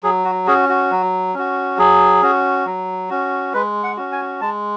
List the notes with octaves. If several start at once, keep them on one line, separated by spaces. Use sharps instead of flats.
F#3 G#4
F#4
C#4 F#4 G#4
F#4
F#3
C#4 F#4
F#3 G#4
C#4 F#4
F#3
C#4 F#4
G#3 B4
F#5
C#4 F#4
G#5
G#3 A5